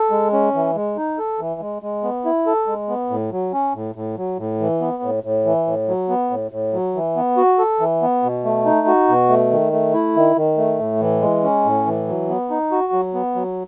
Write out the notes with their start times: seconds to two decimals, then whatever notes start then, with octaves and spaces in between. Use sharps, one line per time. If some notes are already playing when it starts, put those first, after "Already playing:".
Already playing: A4
0.11 G#3
0.33 C#4
0.54 E3
0.75 G#3
0.97 D#4
1.19 A4
1.39 E3
1.61 G#3
1.82 G#3
2.03 B3
2.25 E4
2.47 A4
2.67 G#3
2.89 B3
3.10 A2
3.32 F#3
3.53 C#4
3.75 A2
3.95 A2
4.17 F#3
4.38 A2
4.60 E3
4.81 B3
5.03 A2
5.24 A2
5.45 E3
5.67 A2
5.88 F#3
6.09 B3
6.30 A2
6.51 A2
6.73 F#3
6.95 E3
7.16 B3
7.37 F#4
7.59 A4
7.80 E3
8.02 B3
8.23 B2
8.45 A3
8.66 D#4
8.87 F#4
9.09 B2
9.29 A3
9.51 D#3
9.73 A3
9.94 E4
10.16 D#3
10.36 D#3
10.57 A3
10.79 A2
11.01 E3
11.22 G#3
11.43 C#4
11.65 A2
11.86 E3
12.08 F#3
12.29 B3
12.50 D#4
12.72 F#4
12.93 F#3
13.14 B3
13.35 F#3